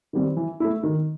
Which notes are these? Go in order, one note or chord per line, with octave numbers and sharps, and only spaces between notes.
D#3 G3 C4
E3
A3 E4
D#3